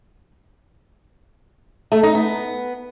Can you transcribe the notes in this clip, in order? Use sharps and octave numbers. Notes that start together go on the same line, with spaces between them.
A3
D#4
B3